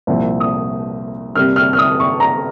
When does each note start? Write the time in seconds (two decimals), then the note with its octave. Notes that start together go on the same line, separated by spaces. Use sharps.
0.07 C2 A#2 F3 C4
0.40 D#6
1.35 C3 G3 A#3 F6
1.56 F6
1.73 F6
1.79 D#6
2.00 C#6
2.20 A#5